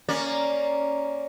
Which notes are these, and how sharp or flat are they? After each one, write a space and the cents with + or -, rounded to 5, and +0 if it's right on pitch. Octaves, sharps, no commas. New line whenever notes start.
A#3 +0 C#4 +0 D5 +0